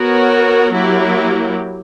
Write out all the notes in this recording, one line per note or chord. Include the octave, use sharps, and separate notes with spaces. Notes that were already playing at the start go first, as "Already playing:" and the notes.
Already playing: B3 F#4 A#4 C#5
F#3 A#3 E4 G4